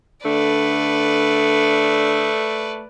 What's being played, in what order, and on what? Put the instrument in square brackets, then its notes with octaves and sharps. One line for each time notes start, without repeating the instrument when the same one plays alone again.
[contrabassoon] D3 [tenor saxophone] A3 [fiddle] B4 D5